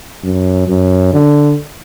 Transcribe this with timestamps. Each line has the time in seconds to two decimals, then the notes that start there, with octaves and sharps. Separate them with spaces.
0.23 F#2
0.68 F#2
1.13 D3